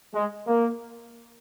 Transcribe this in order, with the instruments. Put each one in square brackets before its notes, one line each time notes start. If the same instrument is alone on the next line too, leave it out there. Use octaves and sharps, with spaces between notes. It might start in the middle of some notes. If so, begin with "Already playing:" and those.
[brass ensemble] G#3
A#3